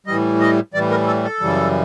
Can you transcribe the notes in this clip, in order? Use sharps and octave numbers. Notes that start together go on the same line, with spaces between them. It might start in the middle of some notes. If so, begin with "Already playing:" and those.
A2 E3 G3 D#5
D#5
A2 E3 G3 D5
A#4
A4
A4
F#2 C#3 E3 G3